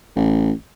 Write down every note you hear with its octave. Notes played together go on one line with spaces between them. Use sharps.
A1